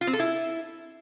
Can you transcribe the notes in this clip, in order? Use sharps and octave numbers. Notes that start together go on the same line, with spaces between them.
F4
C4
A4
E4